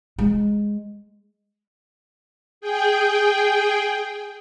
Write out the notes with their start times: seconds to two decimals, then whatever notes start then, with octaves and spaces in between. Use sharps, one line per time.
0.19 G#3
2.61 G#4 G5